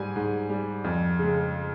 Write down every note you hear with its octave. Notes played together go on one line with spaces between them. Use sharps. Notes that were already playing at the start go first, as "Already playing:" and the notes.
Already playing: G#2 G3 G#5
G#2
G3
F2
C#3 G#3